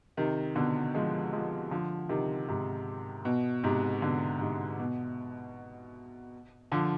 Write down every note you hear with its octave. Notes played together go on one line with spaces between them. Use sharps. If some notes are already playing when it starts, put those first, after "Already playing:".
C3 D#3
B2 D3
F3 G#3
F3 G#3
D3 F3
C3 D#3
G#2 C3
B2
G#2 C3
B2 D3
G#2 C3
B2
D3 F3